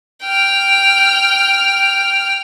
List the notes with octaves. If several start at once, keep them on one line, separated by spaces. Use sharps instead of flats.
G5 F6